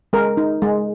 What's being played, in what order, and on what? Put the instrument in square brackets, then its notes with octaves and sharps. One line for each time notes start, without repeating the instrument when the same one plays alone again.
[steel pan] G#3 A#4
D#4
G#3